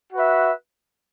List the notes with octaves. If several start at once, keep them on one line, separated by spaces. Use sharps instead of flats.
F#4 B4 E5